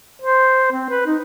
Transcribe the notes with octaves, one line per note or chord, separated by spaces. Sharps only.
C5
C4
B4
D#4